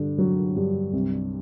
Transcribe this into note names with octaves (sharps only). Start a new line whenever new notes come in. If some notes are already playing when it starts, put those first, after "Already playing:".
Already playing: G2 D3
F#3
G2
C2